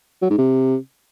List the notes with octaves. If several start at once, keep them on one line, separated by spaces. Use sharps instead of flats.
F#3
G#2
C3